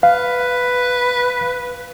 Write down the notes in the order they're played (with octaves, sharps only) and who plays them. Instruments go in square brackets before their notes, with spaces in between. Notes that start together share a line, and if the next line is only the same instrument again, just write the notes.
[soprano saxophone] B4 [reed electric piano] F5